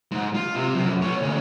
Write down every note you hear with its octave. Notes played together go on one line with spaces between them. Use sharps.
G#2
F4
C3
F#2 F3
B3 C#5
D2 C#4